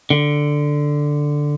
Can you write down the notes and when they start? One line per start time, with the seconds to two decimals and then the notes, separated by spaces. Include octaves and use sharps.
0.10 D3